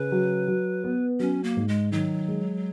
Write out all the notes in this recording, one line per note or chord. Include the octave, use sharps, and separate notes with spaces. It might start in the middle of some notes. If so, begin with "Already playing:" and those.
Already playing: C#3 B4
F#3
F#3
B3
F#3 C#4
A#3
G#2
G#3
D#3 F#3
G#3